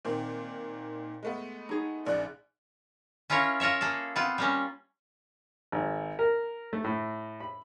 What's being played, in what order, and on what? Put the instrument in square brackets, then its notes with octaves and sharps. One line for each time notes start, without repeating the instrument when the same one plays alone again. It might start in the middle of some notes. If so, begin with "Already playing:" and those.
[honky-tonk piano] A#2 D#3 C4
G#3 A3 B3
[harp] D#4 G#4
[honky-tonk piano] A#1 C#3 F#6 [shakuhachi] D5
[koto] C#4 E4 F4 A#4 C#5
F4 A#4 C#5 E5
A#3 G#4 A4
B3 C4 F4
G3 A#3 C#4
[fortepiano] G#1
A#4
A3
A2
B5